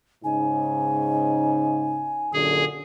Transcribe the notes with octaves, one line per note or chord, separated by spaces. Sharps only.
G#2 C#3 D#4 G#5
F#2 A#2 D3 G#4